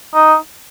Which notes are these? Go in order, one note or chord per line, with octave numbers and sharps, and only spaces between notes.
D#4